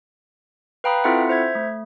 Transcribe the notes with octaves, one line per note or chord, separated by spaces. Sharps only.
B4 F5 G5 A#5 B5 D#6
C4 E4 F4 A4 E5 F#5
C5 E5 G#6
A3